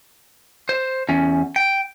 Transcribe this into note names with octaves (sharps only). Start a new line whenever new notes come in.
C5
E2 C#4
G5